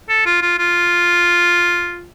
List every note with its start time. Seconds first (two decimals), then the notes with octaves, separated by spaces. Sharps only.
0.09 A4
0.26 F4
0.42 F4
0.59 F4